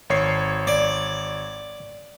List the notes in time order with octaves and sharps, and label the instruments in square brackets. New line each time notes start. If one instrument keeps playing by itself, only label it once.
[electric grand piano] G#1 C#5 C7
[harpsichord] D5